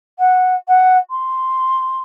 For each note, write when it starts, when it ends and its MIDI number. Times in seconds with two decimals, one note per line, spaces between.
0.18 0.54 78
0.67 0.97 78
1.10 2.02 84